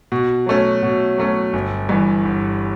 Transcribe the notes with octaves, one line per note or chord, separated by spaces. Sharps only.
B2
F#3 A3 C#4
B2
F#3 A3 C#4
G1
G2 E3
G1